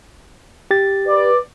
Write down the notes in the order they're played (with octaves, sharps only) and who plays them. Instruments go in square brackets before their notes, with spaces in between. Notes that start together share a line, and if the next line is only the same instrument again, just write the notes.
[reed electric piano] G4 A6
[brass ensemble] B4 D5